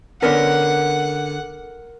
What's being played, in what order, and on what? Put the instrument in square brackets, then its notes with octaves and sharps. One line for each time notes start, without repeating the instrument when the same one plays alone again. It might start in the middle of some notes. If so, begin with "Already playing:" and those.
[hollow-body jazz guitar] D3 B3 C#4 [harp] A#4 [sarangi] F#5